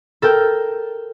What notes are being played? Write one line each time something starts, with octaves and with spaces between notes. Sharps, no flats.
A4 A#4 G5